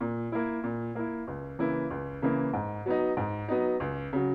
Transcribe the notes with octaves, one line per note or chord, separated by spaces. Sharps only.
A#2
A#3 E4
A#2
A#3 E4
C#2
C#3 E3 A#3 E4
C#2
C#3 E3 A#3 E4
G#2
F#3 B3 D#4
G#2
F#3 B3 D#4
C#2
C#3 F#3